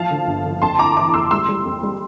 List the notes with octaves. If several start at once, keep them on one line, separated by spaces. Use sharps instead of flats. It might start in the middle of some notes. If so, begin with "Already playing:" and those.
Already playing: F3 F5 A5
D3
G1
D3
F2 A5 C6
E4 A#5 D6
E3 A#5 D6
F2 C6 E6
G3 C6 E6
G3
F2
G3